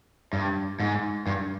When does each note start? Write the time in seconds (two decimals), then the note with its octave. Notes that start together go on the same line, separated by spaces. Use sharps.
0.33 G2
0.80 G#2
1.27 G2